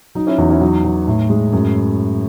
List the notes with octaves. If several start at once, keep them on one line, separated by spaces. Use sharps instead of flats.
F#3 D#4
C#4 E4
E2 D#4 F#4
C#4 E4
F#3 D#4
F#3
A2
G#3
F#2